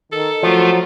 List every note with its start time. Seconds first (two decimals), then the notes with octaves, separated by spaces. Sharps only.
0.12 D#3 A4
0.43 F3 F#3 A3 F4